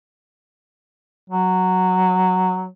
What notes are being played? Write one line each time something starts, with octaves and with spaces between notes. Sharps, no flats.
F#3